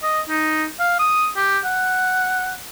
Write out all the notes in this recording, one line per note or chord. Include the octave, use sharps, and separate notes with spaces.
D#5
D#4
F5
D#6
G4
F#5